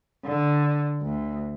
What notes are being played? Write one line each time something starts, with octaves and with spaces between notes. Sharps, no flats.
D3
D2